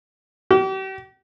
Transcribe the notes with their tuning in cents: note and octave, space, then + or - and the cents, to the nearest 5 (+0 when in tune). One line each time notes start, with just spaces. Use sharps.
G4 -40